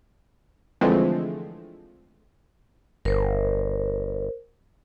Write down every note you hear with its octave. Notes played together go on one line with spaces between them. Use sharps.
D3 E3 F3 G#3 A3 C4
G1 A#4 C5